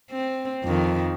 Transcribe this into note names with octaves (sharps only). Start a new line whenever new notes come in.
C4
F2 D#3